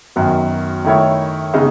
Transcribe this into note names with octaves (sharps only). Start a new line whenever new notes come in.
F#2 D#3 F#3 B3
D#3 A3 E4 A4 C#5
C#3 G#3 B3 D#4